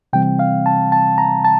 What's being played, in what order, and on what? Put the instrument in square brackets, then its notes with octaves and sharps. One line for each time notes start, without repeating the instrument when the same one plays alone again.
[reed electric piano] C3 E3 G3 C4 G5
F5
A5
A5
A#5
A5